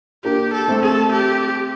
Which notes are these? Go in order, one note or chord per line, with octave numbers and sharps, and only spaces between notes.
A#3 D4 G4
A4
A3 C4
A4
G4